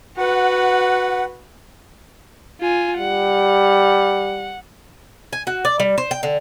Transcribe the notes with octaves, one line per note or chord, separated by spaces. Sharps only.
F#4 B4 F#5
F4 G#5
G3 F#5
G#5
F#4
D5
G3
C5
G5
D3